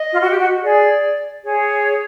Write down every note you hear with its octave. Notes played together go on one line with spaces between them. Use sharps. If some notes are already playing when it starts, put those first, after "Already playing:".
Already playing: D#5
F4
F#4
G4
F#4
G#4 D5
G#4 C#5